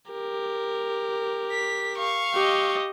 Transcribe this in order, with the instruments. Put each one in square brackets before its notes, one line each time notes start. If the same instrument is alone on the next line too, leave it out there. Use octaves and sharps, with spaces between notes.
[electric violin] G4 A#4
[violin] B6
F5 C#6
[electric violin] G4 D#5